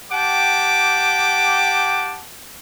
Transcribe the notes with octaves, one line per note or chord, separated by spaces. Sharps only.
G4 F#5 G5 A5 D6